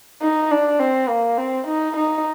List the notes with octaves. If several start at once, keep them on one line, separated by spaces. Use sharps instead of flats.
D#4
D4
C4
A#3
C4
D#4
D#4